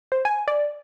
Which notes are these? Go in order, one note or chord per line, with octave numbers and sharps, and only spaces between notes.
C5
G#5
D5